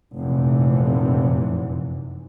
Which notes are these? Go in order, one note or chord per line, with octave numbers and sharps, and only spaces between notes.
F1 A#1 F#2 C3 E3